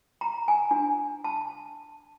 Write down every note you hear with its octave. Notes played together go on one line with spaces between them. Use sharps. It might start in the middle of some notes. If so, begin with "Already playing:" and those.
A#5
G#5
D4
A5